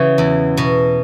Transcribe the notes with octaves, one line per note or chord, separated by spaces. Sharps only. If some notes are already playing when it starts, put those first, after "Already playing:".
Already playing: C#3 E3 F#4
E2
B2